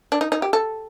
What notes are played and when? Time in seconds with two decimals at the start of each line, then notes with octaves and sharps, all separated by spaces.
0.12 D4
0.21 D#4
0.32 D#4
0.42 G4
0.53 A4